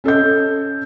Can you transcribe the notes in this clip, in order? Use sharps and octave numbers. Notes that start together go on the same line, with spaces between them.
C#4 A4 D#5 G6